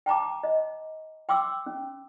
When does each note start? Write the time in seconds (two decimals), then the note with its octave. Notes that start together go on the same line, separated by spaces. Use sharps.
0.06 G5 A5 A#5 D6
0.43 D#5
1.29 G5 C6 D6 E6
1.66 C#4